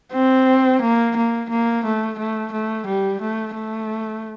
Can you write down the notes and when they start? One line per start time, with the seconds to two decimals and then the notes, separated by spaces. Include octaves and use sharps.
0.13 C4
0.82 A#3
1.17 A#3
1.49 A#3
1.85 A3
2.19 A3
2.52 A3
2.86 G3
3.21 A3
3.55 A3